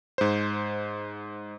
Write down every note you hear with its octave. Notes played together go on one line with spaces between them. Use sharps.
G#2 C5